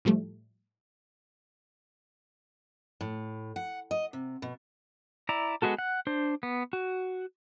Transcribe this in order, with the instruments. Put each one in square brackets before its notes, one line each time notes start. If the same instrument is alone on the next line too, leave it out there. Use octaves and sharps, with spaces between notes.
[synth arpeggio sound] A2 F3 G3 A3
[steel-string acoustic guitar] A2
F#5
D#5
C3
B2
[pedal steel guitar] E4 D5 A#5
G#3 B3 F#4 A4
F#5
D4 C5
B3
F#4